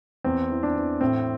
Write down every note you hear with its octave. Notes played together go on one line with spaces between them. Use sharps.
E2 C4
E3
D4
E3
A2 C4